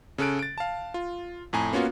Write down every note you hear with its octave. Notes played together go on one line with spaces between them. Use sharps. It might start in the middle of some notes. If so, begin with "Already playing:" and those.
C#3 C#4 A4 F#6 D7
A6 D7
F5 A5
F4
F2 A2 G#5 A#5
A#3 B3 C#4 F4 F#4